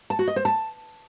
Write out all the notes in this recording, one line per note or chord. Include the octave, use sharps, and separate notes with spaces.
A5
F#4
D#5
C5
A5